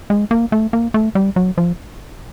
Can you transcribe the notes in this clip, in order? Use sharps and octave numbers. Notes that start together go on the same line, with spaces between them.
G#3
A#3
A3
A#3
A3
G3
F#3
F3